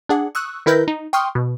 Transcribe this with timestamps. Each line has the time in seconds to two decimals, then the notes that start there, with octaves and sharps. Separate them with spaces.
0.09 D4 G#4 F#5
0.35 C#6 D#6 E6 F#6
0.66 D#3 E4 A#4 B4 G6 A#6
0.88 D#4
1.13 G5 C6 C#6 D#6 F6
1.35 B2